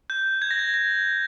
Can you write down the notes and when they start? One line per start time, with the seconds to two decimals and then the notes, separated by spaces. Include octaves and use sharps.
0.10 G6
0.42 G#6
0.51 A#6
0.59 G#6
0.74 A#6